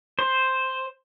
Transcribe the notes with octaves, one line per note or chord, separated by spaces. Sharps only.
C5